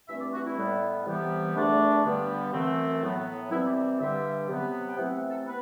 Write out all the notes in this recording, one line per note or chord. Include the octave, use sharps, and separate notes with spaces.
G2 E3 A3 C4 E5
D5
F#4
E4
A2 G3 B3
C3 E3 G3 B3
E2 D3 A3 D4
G2 D3 G3 B3
F#2 E3 A3 C4
A2 F#3 B3
C3 E3 G3 C4 E4
D5
D5
G2 D3 G3 E5
C3 F#3 B3
G5
C3 E3 A3 C4 F#5
F#5
A4
B3 B4